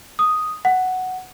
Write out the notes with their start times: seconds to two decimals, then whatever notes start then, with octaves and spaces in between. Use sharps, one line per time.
0.19 D#6
0.65 F#5